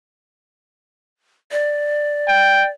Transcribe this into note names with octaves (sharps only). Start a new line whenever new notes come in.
D5
G5